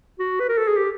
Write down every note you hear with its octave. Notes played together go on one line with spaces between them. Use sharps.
F#4
B4
A#4
A4
G#4
G4